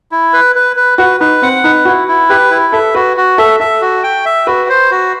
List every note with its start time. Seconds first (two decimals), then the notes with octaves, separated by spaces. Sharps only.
0.12 E4
0.33 B4
0.56 B4
0.76 B4
0.98 F#4 B4
1.20 D#4 B4
1.42 C4 F#5
1.64 D#4 B4
1.85 E4 F#4
2.08 E4
2.29 G4 B4
2.51 E4
2.73 A4 E5
2.95 F#4 B4
3.17 F#4
3.38 A4 E5
3.60 A4 E5
3.81 F#4
4.04 G5
4.26 E5
4.47 F#4 B4
4.69 C5
4.91 F#4